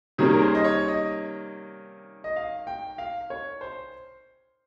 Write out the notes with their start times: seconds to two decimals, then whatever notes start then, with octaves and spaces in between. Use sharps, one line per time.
0.18 C3 D#3 G3 A#3 C#4 G#4
0.33 A#4
0.42 C5
0.55 D#5
0.64 C#5
0.88 D#5
2.24 D#5
2.36 F5
2.67 G5
2.98 F5
3.30 C#5
3.61 C5